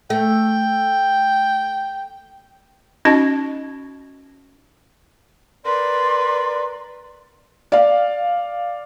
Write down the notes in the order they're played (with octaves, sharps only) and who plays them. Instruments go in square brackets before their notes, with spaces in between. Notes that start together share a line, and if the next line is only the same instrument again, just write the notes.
[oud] A3 [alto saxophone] G5
[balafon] C#4 D#4 F#4 D#5 A5
[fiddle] A#4 B4 [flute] D5 [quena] C6
[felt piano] D5 F5